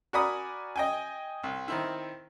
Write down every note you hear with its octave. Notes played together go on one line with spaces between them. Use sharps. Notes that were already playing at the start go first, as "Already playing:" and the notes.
F#4 A#4 D5 G#5 B5 D#6
D#5 G5 G#5
C2
D#3 C4 E4